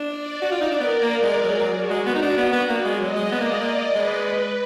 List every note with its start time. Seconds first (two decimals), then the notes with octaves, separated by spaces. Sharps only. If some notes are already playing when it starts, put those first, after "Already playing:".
Already playing: D4
0.17 D5
0.42 F#4
0.51 F4
0.61 D#4
0.71 D4
0.80 B3 A#4
1.01 A#3
1.22 G#3
1.43 F#3 G#4
1.59 F#3
1.75 F#4
1.90 G#3
2.06 B3 F#4
2.15 D#4
2.22 D4
2.37 B3
2.52 B3
2.68 A#3 D5
2.85 G#3
3.00 F#3 D#5
3.16 G#3
3.32 B3 D5
3.41 A#3
3.51 G#3
3.60 A#3
3.94 G#3 B4